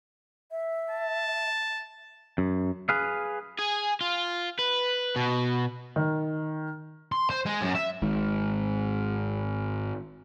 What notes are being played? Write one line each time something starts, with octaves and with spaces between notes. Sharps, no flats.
E5
A5
F#2
G#4 B4 F5
G#4
F4
B4
B2
D#3
C6
C5
G#3
F#2
E5
G#1 G#2